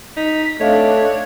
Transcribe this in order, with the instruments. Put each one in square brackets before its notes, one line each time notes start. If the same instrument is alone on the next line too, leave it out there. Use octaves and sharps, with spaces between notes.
[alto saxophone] D#4 [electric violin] B6
[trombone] A3 [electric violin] C4 D4 [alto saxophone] C#5 [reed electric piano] D#5 F5